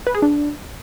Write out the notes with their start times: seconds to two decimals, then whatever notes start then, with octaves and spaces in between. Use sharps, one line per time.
0.07 B4
0.14 G#4
0.22 D4